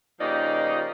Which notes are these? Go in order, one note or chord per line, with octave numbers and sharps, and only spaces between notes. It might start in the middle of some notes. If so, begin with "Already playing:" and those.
C#3 F3 A#3 D#4 G4 D5